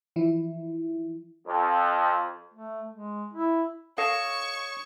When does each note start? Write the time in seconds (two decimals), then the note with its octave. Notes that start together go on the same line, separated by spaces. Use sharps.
0.16 E3 F3 E4
1.46 F2
2.54 A3
2.92 G#3
3.33 E4
3.98 A4 C#5 D#5 F5 C#6 D#6 E7